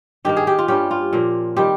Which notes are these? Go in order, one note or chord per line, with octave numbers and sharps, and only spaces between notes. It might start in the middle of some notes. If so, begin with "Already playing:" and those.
G2 D#3 A#3 G4
G#4
G4
F4
G2 G3 C#4 G4
F4
A#2 F3 A#3
D#3 G3 C4 G4